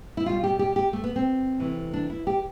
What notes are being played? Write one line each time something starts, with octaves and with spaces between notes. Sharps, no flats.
E4
B2 G3 F4
G4
G4
G4
A3
B3
C4
C3 E3 A3
D4
E4
G4